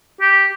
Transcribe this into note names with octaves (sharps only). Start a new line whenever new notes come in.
G4